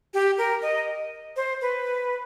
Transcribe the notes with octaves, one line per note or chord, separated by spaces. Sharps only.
G4
A#4
D#5
C5
B4